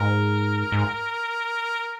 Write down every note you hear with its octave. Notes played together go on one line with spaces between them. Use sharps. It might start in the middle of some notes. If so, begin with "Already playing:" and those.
Already playing: G#2 A#4
G#2